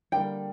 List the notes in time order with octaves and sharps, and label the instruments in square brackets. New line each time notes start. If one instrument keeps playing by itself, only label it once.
[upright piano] D3 G3 A#3 [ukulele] G5